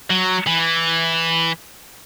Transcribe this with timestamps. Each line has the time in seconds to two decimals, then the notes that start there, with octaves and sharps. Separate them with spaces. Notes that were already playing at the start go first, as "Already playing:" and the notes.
0.10 F#3
0.47 E3